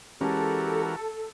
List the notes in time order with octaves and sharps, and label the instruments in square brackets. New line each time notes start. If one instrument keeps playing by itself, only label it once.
[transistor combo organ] E3 F#4 A#4 [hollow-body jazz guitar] G#3 C#4 [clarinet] G4 [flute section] A4